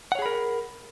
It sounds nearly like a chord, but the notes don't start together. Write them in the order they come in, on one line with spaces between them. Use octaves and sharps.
F#5 C#5 G#4 B5 A#4